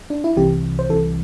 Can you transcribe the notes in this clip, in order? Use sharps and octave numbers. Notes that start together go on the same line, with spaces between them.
D4
E4
C2 C3 E3 G4
C5
C2 C3 E3 A4